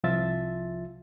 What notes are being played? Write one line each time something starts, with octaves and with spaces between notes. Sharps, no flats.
C2 F3 F4 E5 A6